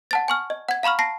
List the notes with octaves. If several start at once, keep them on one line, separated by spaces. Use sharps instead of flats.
F#5 A5 A6
G#5 C#6 F6
D#5
F#5 G#6
F5 A#5 B5 C#6 F6
A5 A#6 C7